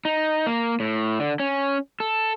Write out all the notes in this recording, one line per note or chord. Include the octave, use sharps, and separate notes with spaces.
D#4
A#3
A2
D3
C#4
A4